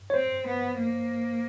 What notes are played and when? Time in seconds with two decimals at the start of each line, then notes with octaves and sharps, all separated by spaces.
0.10 C#5
0.14 C4 C5
0.46 B3
0.78 A#3